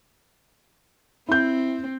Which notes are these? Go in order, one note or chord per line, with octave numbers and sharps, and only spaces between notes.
C4 E4 G6